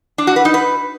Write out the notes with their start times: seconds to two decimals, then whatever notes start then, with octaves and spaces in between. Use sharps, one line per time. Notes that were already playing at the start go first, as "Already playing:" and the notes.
0.18 D4
0.27 F#4
0.36 B4
0.45 D#4
0.54 B4